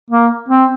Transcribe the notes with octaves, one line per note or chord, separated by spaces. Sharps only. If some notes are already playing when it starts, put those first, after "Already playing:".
A#3
C4